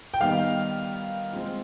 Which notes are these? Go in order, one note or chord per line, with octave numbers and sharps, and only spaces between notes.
G5
D#3 G3 B3 D#4 F5
F3 G#3 C4